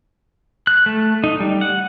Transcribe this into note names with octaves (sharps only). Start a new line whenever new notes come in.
F#6
A3
D#4
G3
F#5